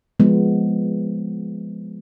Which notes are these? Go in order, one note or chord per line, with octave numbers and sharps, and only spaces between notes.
F3 G#3 B3